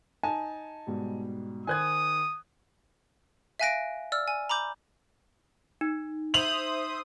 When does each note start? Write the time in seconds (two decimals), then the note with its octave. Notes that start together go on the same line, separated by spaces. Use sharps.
0.23 D#4 G#5 A5
0.87 G#2 B2 G3
1.67 D#3 C5 G#5 D#6 F#6 G#6
3.60 E5 F5 G#5 F#6 A#6 D7
4.12 D5 E6 F6
4.28 G#5
4.49 A#5 B5 D6 G6
5.81 D#4
6.34 C5 E5 D#6 F7 F#7